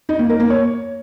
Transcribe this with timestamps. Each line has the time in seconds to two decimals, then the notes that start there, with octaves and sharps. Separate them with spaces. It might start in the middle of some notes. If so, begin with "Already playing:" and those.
0.09 D#4
0.19 A#3
0.29 A#4
0.40 A#3
0.50 C#5